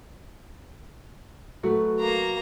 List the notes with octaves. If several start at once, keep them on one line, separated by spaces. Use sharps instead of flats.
F#3 A3 F#4 B4
A#3 A#5